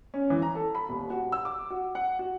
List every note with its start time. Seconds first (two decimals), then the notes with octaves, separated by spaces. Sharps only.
0.14 C#4
0.30 E3
0.42 A#5
0.55 A4
0.75 B5
0.89 D#1
1.10 F#4
1.32 E6
1.45 D6
1.70 F#4
1.95 F#5
2.19 F#4